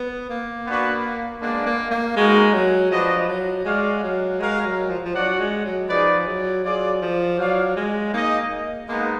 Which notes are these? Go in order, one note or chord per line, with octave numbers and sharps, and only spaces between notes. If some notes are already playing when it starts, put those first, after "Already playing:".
Already playing: B3
A#3
B3 D4 F#4 B4
G#3 A#3 B3 D4
A#3
A#3
G#3 B3 D#4 F#4 A#4
F#3
F3 D4 F#4 B4 D#5
F#3
G#3 F#4 D5 F5
F#3
G#3 F#4 A#4 F5
G#3
F#3
F3
F3
F#3 D4 F#4 D5 F#5
G#3
F#3
F3 D#4 G#4 B4 D5
F#3
F#3 F4 G#4 D5
F3
F#3 F#4 D5 F5
G#3
A#3 D#4 G#4 D#5
G#3 A#3 B3 D#4